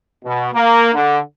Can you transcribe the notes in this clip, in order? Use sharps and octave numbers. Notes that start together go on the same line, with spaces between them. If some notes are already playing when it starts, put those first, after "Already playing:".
B2
A#3
D3